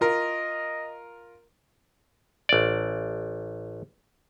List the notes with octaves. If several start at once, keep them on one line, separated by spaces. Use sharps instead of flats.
F4 A#4 D#5
A1 D5